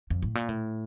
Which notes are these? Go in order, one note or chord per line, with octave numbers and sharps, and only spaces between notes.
F2
A2
A#2
A2